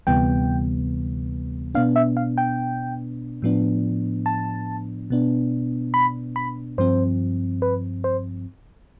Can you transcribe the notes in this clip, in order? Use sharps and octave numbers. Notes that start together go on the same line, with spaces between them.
D2 C3 E3 G3 B3 G5
B2 B3 D4 F5
E5
F5
G5
A2 F3 B3 D4
A5
B2 B3 D4
B5
B5
G2 F3 C4 C5
B4
C5